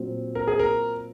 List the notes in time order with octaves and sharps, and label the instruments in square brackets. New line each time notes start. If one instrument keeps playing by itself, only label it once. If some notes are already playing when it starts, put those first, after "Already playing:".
Already playing: [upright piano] A#2 F#3 C4
[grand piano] A#4
G#4
A#4